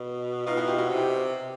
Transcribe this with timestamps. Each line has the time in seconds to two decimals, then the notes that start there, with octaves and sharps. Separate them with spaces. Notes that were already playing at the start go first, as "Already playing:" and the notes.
Already playing: B2
0.46 B2 D#4 F4
0.57 E4 F#4
0.67 F4 G4
0.78 E4 F#4
0.89 C3 F#4
0.98 G4